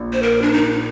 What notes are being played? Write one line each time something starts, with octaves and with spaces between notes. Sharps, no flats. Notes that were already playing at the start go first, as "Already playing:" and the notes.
Already playing: A#1
C5
A#4
D4
D#4